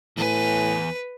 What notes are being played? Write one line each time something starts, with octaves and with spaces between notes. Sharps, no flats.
E2 A2 B4 G#5